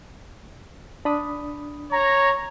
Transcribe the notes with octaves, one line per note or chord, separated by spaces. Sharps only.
D4 B5 D#6
C#5 A#5